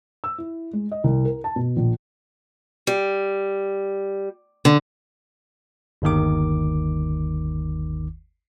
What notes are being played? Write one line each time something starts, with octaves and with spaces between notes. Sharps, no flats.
E6
E4
G#3
D#5
C2
A#4
A5
B2
A#1
G3
D3
G1 D#2 D#3 D6